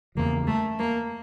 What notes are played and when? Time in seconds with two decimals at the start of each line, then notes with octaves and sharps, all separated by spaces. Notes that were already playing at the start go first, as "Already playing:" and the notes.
0.15 E2 C#3 F3 A#3
0.47 A3
0.79 A#3